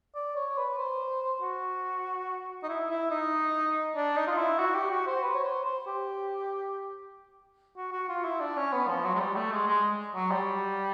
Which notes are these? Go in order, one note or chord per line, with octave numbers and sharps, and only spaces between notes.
D5
C#5
B4
C5
F#4
D#4
E4
E4
D#4
D4
D#4
F4
E4
F#4
G4
F#4
C5
B4
C#5
C5
C5
G4
F#4
F#4
F4
E4
D4
C#4
B3
F3
F#3
G#3
G3
A3
G#3
G#3
F#3
G3